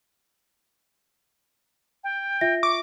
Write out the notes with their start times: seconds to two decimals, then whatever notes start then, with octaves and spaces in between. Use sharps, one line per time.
2.04 G5
2.41 F4 E5 A#6
2.63 C#6 D6